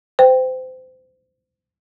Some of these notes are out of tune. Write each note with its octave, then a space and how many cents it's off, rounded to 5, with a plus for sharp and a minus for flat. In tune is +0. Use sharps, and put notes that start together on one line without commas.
C5 -30 G5 +0